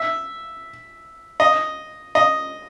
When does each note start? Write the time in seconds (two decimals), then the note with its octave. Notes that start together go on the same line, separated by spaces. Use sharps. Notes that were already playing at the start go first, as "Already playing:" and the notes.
Already playing: E5
1.40 D#5
2.15 D#5